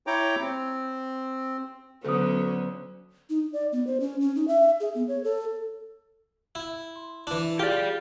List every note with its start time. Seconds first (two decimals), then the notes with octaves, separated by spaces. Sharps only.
0.07 E4 C#5 G5 A#5 D6
0.41 C4
2.04 D2 D3 F#3 B3 C#4 A4 D#6
3.30 D#4
3.53 D5
3.72 B3
3.87 C5
4.00 C#4
4.21 C#4
4.35 D#4
4.48 E5
4.80 G#4
4.95 B3
5.08 C#5
5.24 A4
6.55 E4
6.96 C6
7.27 E3 D4 E4
7.59 F4 G4 G#4 D5